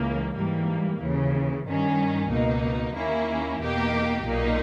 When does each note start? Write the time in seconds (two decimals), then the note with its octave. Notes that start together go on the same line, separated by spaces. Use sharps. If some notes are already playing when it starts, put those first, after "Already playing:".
Already playing: C#2 C#3 E3 A#3
0.35 G#2 E3 G3 A#3
1.00 D#2 C#3 E3
1.65 G2 D#3 G3 C#4
2.30 C#2 B2 A#3 D#4
2.94 D#2 D#3 A#3 C#4 E4
3.60 E2 B2 A#3 D#4 G4
4.25 B1 A#2 A#3 D#4